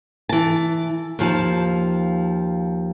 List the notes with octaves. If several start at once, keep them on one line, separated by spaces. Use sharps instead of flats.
E3 A5
D#2 F3 A5